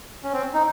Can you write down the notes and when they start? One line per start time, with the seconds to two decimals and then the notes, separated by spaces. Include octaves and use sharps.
0.23 C#4
0.33 C4
0.54 D#4